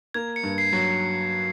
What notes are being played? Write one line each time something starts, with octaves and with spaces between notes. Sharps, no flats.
A#3 G#6
C#7
G2
C7
F#3
C7